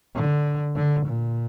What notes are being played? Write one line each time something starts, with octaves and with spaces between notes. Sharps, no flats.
D3
D3
A#2